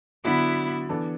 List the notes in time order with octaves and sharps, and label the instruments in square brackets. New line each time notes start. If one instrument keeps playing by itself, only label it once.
[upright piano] D3 F#3 D4 F#4 [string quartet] B3 E4
[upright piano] E3 B3 D4 A4